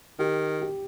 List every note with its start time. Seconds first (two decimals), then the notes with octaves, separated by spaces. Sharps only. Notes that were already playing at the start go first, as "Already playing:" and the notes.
0.19 D#3 G4
0.61 G4